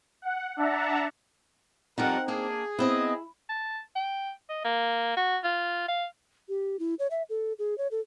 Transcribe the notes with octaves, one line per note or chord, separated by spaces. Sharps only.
F#5
D4 E5 F#5 A5 A#5
F2 F3 G3 C4 D#4 A#4 F#5
A#3 D4 G#4
B3 C4 E4 D#5
A5
G5
D#5
A#3
F#4
F4
F5
G4
E4
C#5
E5
A4
G#4
C#5
A4